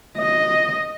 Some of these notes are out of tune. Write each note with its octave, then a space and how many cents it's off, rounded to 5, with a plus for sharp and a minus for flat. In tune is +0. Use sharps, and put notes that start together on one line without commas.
D#5 +0